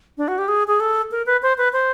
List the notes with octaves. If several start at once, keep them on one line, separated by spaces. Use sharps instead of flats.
D4
F#4
G4
G#4
G#4
A4
A#4
B4
C5
B4
C5